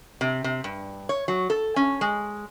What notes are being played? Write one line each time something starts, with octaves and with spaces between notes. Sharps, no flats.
C3
C3
G2
C#5
F#3
A4
C#4
G#3